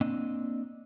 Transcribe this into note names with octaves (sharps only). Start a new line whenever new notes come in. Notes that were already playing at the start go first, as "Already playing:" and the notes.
A#3 C4 D4 D#5